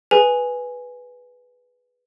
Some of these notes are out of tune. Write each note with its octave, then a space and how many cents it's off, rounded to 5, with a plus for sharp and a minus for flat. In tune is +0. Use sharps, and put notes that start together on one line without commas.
G#4 +0 B4 +0 G#5 +0